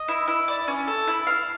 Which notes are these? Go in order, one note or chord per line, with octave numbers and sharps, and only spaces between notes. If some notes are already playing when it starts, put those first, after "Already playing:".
Already playing: D#5
E4
E4
D5
C#4
A4
E4
F5